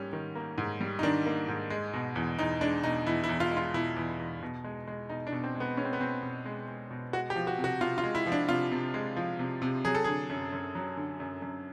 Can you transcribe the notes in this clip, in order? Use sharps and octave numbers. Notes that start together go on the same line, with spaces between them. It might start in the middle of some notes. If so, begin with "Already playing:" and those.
Already playing: G#2 G3 A#3 C#4
D#3
A#3
G#2
G3
D#4
D#3 D4
A#3
G#2
G#3
B2
E2
E2 D#4
G#3 D4
B2 D#4
E2 E4
E4
E2
F4
G#3
F4
B2 E4
E2
E2
B2
G#3
G#3
B2 D#4
D4
B2
C4
G#3
B3
G#3 C#4
C4
B3
B2 C4
B2
G#3
G#3
B2
G#3 F#4
G4
F3
F#4
C3
F#4
C3 F4
F4
G#3
E4
F3
D4
C3 F4
C3
G#3
F3
C3
C3
F#3 G#4
A4
D3 G#4
F#2
F#2
F#3
D3
F#2
F#2